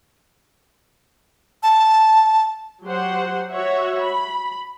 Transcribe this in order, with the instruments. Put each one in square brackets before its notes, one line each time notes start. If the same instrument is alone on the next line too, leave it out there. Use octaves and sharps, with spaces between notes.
[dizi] A5
[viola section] F#3 G4 C5 F#5
F#4 C#5 E5 F#5
B5